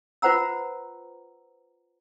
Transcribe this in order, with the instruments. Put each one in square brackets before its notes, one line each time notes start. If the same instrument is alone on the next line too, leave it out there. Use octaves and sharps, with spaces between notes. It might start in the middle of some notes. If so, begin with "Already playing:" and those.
[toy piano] F4 B4 C5 F#5 A#5 E6